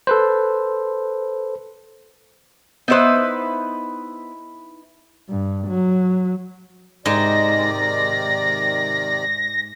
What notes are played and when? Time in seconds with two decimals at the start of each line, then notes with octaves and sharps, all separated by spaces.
0.07 A4 B4 C5
2.88 B3 D#4 E4 B4 C5
5.29 G2
5.68 F#3
7.05 G#2 C3 D#3 D5 A#6